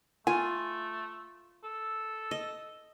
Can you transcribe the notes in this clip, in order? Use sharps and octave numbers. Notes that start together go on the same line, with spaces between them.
A3 F4 G#5
A4
D#5